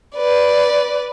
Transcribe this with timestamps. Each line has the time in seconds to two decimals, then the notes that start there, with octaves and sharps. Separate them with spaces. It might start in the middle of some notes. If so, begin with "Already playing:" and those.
0.16 B4 D5